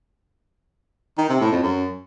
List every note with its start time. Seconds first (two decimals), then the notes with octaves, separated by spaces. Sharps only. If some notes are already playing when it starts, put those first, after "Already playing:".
1.18 D#3
1.29 C3
1.40 A2
1.52 F2
1.63 F#2